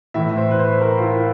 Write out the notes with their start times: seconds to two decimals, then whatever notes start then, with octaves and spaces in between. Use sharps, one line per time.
0.14 A2 E3 E5
0.37 C5
0.51 B4
0.59 C5
0.81 A#4
0.98 F4
1.03 E4